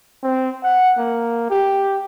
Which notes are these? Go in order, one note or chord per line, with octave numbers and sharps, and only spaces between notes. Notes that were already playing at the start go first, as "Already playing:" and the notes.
C4
F#5
A#3
G4